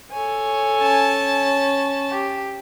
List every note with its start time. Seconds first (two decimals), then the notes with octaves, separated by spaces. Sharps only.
0.12 A4 C#5 G#5
0.82 C#4 A5
2.12 G4